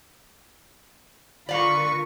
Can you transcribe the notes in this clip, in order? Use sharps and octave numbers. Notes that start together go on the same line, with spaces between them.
D3 F4 A#4 B4 D5 F5 C#6